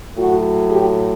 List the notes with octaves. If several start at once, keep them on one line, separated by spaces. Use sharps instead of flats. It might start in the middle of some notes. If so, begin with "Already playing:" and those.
A2 F#3 F#4
G4